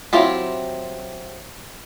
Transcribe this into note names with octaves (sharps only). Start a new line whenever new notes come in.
F#3 C4 E4 F4 G4